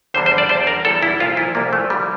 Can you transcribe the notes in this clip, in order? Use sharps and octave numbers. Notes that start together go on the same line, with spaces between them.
E2 D3 G3 C5
C5
D5
E2 D3 G3 C5
A#4
E2 E3 G3 A4
E4
C2 A#2 F3 F4
E4
C2 A#2 F3 A#3
A3
D3 F3 G3